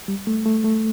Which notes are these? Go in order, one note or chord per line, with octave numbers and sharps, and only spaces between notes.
G3
A3
A3
A3